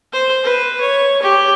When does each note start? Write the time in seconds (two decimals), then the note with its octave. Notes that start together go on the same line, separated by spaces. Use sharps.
0.13 C5
0.44 B4
0.81 C#5
1.22 G4